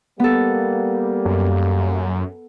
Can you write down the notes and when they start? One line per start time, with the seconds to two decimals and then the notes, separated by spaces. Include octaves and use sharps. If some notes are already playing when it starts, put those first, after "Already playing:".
0.20 G3 A#3 B3 A4
1.26 F#2